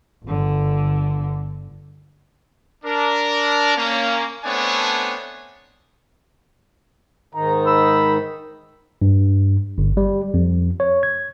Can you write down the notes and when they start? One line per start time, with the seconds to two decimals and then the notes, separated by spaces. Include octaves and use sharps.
0.25 G1 D3
2.84 D4 A#4
3.76 A#3 C#4
4.44 A3 B3 C4 D4 C#5 G#5
7.35 G#2 D#3 D#4 A#5
7.66 B5 E6
9.02 G2
9.78 G1
9.97 G3
10.34 F2
10.80 C#5
11.03 G#6